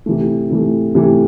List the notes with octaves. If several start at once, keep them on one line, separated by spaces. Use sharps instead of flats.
C3 E3 A3
C3 E3 A3
C3 E3 A3